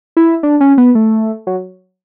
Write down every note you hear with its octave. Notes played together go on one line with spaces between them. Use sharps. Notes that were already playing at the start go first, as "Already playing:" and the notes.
E4
D4
C#4
B3
A3
F#3